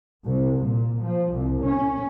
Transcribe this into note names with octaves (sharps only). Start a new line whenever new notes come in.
C2
A#2
F3
C2
C#4